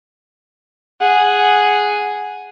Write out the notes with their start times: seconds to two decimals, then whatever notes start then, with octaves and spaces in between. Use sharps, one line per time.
1.01 G#4 F#5